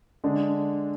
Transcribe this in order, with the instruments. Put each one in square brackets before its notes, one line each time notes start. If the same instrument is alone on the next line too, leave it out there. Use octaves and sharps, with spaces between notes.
[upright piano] D3 G#3 D4